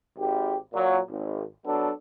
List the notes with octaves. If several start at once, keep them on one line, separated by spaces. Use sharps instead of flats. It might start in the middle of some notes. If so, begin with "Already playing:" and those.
G#1 G4
A#2 F#3
G#1
F#3 B3 D4 A4